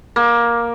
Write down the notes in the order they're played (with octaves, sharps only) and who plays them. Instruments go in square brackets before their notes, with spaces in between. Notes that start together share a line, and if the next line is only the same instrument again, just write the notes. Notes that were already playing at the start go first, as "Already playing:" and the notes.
[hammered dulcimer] A#3